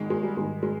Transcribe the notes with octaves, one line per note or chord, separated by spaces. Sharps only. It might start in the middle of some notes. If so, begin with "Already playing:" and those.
Already playing: G#1 G#2 D#3 G#3
G#3
G3
G#1 G#2 D#3 G#3
G#3